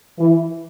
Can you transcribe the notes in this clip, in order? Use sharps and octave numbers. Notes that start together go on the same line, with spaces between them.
E3